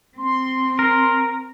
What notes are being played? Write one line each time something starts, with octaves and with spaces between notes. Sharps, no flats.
C4 C6
A#4